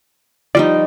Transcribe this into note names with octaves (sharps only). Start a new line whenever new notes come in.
F3 G3 D#4 D5